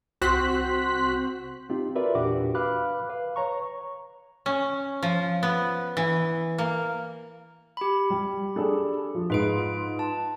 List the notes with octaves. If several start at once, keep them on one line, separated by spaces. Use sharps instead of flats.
C2 C4 F#4 C5 F#6 B6
C4 D#4 F4 G4
F4 F#4 A#4 B4 D5 E5
E2 A#2 D4 F#4 G4 D6
B4 F5 B5 D6 F6 F#6
B4 F5
C#5 A#5 C#6
C#4
F3
B3
E3
A#3
G4 B5
G3
D4 G#4 A4
F3
G#2 G#3 F4 B4 D7
A5